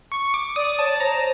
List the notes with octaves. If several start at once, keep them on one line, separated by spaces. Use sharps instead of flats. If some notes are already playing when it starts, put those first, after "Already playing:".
C#6
D6
D5 D#6
C#5 A5
C5 A#5